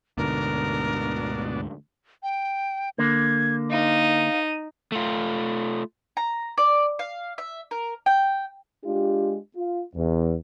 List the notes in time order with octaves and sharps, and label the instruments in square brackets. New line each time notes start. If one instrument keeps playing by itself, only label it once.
[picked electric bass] D2 G#2 D3 [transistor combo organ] B2 D4 [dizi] A#4
[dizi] G5
[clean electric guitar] D3 A#3 [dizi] G#6
[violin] D#4 D#7 [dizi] F5
[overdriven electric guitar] A3 F4
[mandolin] A#5
D5
F5
E5
A#4
G5
[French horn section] G#3 D4 F4 G4
F4
E2